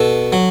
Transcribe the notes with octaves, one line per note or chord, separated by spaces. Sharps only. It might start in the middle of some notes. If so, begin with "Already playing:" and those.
Already playing: B2 A4
F#3